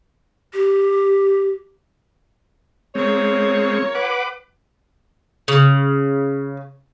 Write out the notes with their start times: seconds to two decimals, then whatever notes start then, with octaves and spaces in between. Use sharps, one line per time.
0.53 G4
2.95 G#3 C4 F4 A#4 C#5
3.95 B4 F#5 D6
5.48 C#3